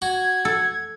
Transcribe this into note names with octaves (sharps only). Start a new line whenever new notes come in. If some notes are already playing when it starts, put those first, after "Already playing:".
F#4 G#6
A4